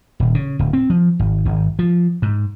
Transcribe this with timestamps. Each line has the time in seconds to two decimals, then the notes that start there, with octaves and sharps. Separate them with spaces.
0.20 D#1
0.35 C#3
0.59 D1
0.73 C4
0.90 F3
1.19 G#1
1.45 G#1
1.79 F3
2.22 G#2